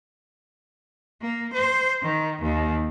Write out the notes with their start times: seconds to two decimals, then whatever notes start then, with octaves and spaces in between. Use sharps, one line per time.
1.21 A#3
1.53 C5
2.02 D#3
2.42 D#2